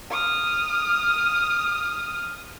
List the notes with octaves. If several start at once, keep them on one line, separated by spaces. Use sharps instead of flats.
D#6 F6